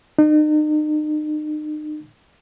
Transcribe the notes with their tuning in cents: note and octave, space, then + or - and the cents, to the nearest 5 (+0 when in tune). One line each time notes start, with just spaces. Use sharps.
D#4 -40